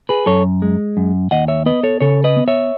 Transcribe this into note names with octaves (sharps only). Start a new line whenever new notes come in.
G#4 B4
F#2 A4 C#5
G#3
F#2
D#2 D#5 F#5
C#5 E5
B3 B4 D#5
A4 C#5
C#3 A4 C#5
B4 D#5
B3
C#5 E5